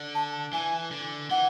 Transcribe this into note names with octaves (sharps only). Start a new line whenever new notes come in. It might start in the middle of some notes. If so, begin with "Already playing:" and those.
Already playing: D3
A5
E3 G#5
D3
E3 F#5